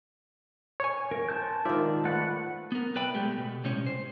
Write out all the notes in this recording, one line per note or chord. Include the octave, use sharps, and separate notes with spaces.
C#5 G#5
A#4
C5 A5 G6
G#2 D#3 F4 D5 E5
A3 B4 F#5
B3 A#4
B1 B4 D5 E5 G5 B5
G#3 A3 G4
B2
A2 C3 G3 G#3 C#4 C#5
C5